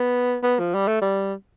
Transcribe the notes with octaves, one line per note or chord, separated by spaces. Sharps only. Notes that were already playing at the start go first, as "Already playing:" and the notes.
Already playing: B3
B3
F3
G3
A3
G3